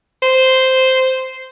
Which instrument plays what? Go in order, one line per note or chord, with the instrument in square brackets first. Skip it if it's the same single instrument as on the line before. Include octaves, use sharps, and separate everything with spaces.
[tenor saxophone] C5